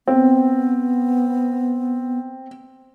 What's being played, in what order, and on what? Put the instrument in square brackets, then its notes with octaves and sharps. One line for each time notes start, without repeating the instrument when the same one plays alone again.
[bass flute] B3 [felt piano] C4